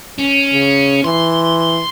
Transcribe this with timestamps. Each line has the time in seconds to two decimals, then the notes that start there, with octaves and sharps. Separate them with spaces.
0.18 C#4
0.53 C#3
1.04 E3 C6